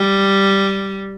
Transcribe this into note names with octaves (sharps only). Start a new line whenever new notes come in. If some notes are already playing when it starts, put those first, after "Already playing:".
Already playing: G3